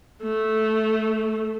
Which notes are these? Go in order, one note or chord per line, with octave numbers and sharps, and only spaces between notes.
A3